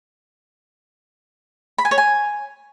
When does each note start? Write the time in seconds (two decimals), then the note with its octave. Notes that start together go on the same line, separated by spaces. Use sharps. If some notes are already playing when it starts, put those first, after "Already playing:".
1.78 B5
1.85 G#5
1.91 C#5
1.98 G#5